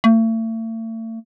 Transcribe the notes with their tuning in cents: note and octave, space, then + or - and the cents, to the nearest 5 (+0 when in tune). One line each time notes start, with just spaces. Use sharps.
A3 +40